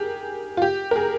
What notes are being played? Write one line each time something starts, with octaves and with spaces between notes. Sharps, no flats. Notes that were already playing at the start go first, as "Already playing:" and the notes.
Already playing: G4 G#4 A#4
F4
G4
A#4
G#4